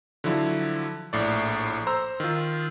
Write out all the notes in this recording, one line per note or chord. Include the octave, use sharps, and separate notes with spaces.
D3 F3 F#3 E4
A#1 A2 D5
C5 A#5 E6
D#3 F4